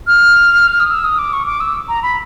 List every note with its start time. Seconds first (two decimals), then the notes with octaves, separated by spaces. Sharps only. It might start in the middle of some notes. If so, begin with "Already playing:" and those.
0.07 F6
0.80 D#6
0.91 E6
1.04 D#6
1.18 D6
1.33 C#6
1.46 D6
1.60 E6
1.89 A#5
2.03 B5